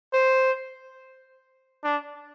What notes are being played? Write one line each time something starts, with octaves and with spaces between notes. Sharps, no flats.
C5
D4